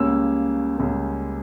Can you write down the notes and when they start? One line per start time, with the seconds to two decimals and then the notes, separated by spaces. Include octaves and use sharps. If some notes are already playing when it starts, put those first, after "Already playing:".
Already playing: C#2 C#3 G3 A#3 C#4 E6
0.77 C#2 C#3 G3 A#3 C#4